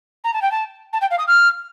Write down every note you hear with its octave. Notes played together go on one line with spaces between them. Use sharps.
A#5
A5
G5
A5
A5
G5
F5
D#6
F6